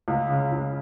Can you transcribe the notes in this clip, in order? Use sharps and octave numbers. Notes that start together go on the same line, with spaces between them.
C#2
C#3
C#2